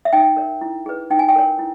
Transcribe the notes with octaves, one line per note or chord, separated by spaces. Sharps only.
E5
D#4 G5
A#4 C#5
E4
G#4 B4
D#4 G5
G#5
G5
A#4 C#5
E4